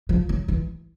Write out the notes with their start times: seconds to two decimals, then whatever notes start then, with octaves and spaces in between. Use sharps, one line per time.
0.09 F3
0.29 F#3
0.48 E3